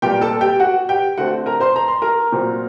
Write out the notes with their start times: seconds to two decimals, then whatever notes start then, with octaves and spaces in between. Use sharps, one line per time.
0.02 A#2 G3 A#3 G4 G5
0.21 A4 A5
0.41 G4 G5
0.60 F#4 F#5
0.89 G4 G5
1.17 D3 A3 C4 F#4 F#5
1.46 A#4 A#5
1.60 C5 C6
1.76 A#5
1.88 C6
2.02 A#4 A#5
2.32 A#2 F#3 C4